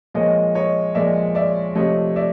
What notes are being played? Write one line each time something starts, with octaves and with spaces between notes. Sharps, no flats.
A#2 F3 G#3 C#5 D#5
C#5 D#5
A#2 F3 G#3 D5 E5
D5 E5
C3 F3 A3 C#5 D#5
D5 E5